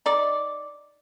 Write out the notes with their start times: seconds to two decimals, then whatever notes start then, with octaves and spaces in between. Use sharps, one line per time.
0.06 D#4 D5